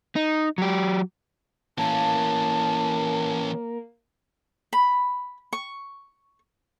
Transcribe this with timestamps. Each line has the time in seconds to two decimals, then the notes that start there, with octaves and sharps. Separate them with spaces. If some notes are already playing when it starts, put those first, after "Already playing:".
0.16 D#4
0.58 F#3 G4
1.78 E3 A#3 C#4 A5
4.73 B5
5.53 C#6